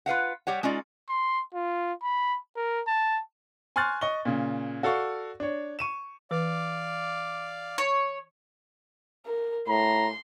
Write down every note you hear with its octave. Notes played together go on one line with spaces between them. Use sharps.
F4 B4 F5 F#5
G3 G4 C#5 F#5
G#3 C#4 D#4 F4 D5
C6
F4
B5
A#4
A5
G#5 C6 C#6 F6 F#6 A6
D#5 C#6 G7
A#2 C#3
F#4 A4 D5 F5 C#6
D4 C#5
C#6 D#7 E7
E3 B4 D5 F5 D6
C#5
A#4
A2 A#5 C6